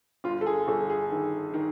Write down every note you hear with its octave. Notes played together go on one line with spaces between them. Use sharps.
G1 F4
A4
G#4
G1 A4
G#4
D#3
D#3